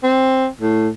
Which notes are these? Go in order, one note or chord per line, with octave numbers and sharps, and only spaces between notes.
C4
A2